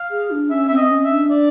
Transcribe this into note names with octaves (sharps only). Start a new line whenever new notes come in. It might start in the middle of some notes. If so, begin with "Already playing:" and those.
Already playing: F5
G#4
D4
C#4 E5
C4 E5
D#5
C#4
E5
D4
D5